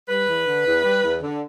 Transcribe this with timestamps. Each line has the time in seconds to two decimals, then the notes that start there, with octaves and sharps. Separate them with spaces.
0.08 G3 B4
0.27 E2
0.46 D3
0.65 E2
0.84 G3
1.03 E2
1.22 D3